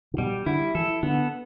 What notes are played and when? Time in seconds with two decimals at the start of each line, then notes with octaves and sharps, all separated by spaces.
0.14 D3
0.18 B2 G3
0.46 D3 E4
0.75 E3 A4
1.03 D3 B3